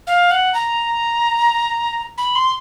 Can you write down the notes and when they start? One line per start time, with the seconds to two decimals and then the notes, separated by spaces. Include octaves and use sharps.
0.07 F5
0.31 F#5
0.54 A#5
2.18 B5
2.35 C6